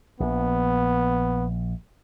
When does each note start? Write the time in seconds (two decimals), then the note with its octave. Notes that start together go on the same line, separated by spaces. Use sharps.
0.20 A#1 B3